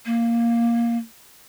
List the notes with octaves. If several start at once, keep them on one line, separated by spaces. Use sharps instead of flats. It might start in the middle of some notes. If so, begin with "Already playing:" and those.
A#3